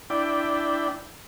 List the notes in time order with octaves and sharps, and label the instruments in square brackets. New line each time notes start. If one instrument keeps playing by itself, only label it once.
[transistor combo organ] D4 E4 G5